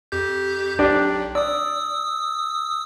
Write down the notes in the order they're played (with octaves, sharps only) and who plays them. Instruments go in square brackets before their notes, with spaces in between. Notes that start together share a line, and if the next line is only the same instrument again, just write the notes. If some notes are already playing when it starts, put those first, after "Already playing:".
[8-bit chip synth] F2 G4 G6
[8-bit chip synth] B1 [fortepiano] D4 G4 D5
[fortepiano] D5 [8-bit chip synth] D#6 E6